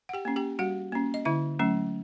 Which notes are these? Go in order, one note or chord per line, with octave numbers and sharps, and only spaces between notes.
F#5
G4 G5
A#3 C#4
G4 G5
G3 F#4 F#5
A#3 C#4
D#5
D3 E4 E5
F#3 A3 C#4